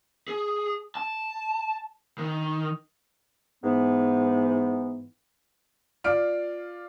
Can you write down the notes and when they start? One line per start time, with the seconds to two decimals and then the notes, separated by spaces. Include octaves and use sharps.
0.28 G#4
0.95 A5
2.18 D#3
3.64 G#2 E3 B3
6.04 F4 D5 F6 D7